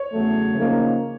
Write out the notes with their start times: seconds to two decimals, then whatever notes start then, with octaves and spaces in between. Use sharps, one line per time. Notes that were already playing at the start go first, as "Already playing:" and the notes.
Already playing: C#5
0.12 E2 C#3 F#3 A3
0.54 C#3 F3 A#3 D#4